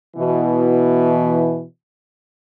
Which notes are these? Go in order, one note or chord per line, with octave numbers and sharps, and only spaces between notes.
B2 E3